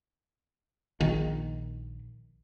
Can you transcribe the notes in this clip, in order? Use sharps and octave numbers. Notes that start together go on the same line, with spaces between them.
A#1 D#3